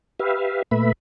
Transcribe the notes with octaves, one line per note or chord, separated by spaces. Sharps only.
G4 B4 E5 F5
A#2 A3 B4 E5 B5